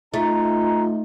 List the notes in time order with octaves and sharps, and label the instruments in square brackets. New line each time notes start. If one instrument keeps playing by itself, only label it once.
[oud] A3 [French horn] D#4 [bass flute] F4 [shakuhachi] A#5